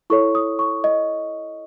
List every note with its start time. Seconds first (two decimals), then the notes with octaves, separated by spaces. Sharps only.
0.10 E4 A4 C#5 C#6
0.35 D#6
0.59 C#6
0.84 D#5